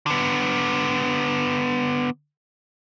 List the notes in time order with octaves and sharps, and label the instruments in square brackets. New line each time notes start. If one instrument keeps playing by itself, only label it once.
[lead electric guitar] D3 B3